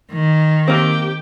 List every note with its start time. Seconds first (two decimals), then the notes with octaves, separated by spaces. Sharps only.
0.12 D#3
0.68 A#3 C4 G4